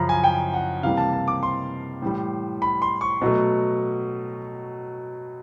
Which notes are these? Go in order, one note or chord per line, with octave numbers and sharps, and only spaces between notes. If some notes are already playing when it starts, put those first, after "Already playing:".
Already playing: F#2 C#3 F3 A#5 B5
G#5
G5
F#5
C3 E3 G3 A#3 F5
A5
A5
D6
C6
A2 E3 G3
B5
C6
C#6
B2 F#3 A3